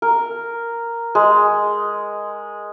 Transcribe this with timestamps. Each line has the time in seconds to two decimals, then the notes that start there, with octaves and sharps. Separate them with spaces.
0.02 A#4
1.15 G#3